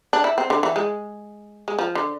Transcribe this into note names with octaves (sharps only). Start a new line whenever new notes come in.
D4
E4
C4
D3
E3
G#3
G#3
F3
D3